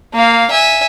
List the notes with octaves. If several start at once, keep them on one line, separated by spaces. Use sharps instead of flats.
A#3 F5
E5 G#5